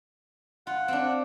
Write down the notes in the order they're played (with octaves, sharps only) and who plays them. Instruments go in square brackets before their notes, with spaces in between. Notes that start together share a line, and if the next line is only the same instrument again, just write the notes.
[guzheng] F4 [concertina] F#5
[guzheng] C4 D4